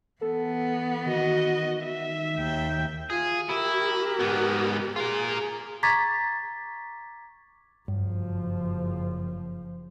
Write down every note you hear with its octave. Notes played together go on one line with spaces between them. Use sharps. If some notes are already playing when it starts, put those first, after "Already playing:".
E3 B3 A4
D#3 F#4 D#5
E5
D#2 G5
F4 G#4
E4 G4 A#4
G#2 B3
F4 G#4 A#4
A#5 C#6 D6 G#6 A6 B6
F#1 G2 F3